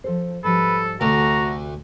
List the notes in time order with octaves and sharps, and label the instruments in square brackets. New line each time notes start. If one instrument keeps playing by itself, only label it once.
[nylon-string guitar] F3 A4 C5
[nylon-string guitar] G#2 F3 G3 [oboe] A4 [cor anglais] B4
[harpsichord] D2 [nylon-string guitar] C3 A3 A4 [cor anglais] F#4 [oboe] A#5